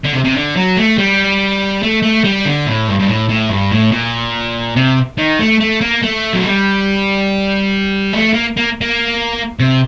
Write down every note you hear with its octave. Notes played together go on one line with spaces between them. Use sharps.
D3
C3
C3
D3
F#3
A3
G3
A3
A3
G3
D3
A2
G2
G2
A2
A2
G2
A2
A#2
C3
D#3
A3
A3
A#3
A3
F#3
G3
A3
A#3
A#3
A#3
C3